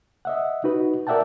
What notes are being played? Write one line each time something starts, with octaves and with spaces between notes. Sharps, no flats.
D#5 E5 F#5
D#4 F#4 B4
A#4 D5 E5 F#5 G5 A5